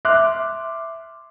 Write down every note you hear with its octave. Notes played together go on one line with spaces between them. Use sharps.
E5 C6 D6 F6 F#6